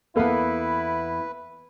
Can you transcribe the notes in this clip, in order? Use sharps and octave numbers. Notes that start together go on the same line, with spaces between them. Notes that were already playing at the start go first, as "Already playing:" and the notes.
E2 A#3 B3 E4 A4 B4 F5